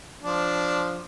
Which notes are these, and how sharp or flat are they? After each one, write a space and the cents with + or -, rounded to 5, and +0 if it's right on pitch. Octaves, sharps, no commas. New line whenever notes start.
F3 +0 D4 -5